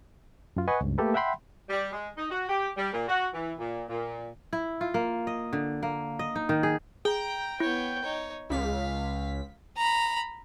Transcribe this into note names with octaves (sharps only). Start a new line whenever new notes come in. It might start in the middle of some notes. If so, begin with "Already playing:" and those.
F#2 F4
B4 D#5 F#5 G#5 C#6
C#2 G2
A3 A#3 G4 A4 B4
E5 F#5 G5 B5 C6
G3
G#3
D#4
F#4
G4
G3
A#2
F#4
E3
A#2
A#2
E4
F4
A#3
D#5
D3
A#3
D#5
D#4
D#3
G#4
G#4 G5 A#5
B3 E4 C#5
D#4 C#5
C#2 F5 B6
A#5 B5